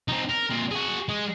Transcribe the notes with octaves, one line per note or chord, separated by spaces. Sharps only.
C4 D#4
A#4
A#2 C4
F#4 G#4
G#3 G#4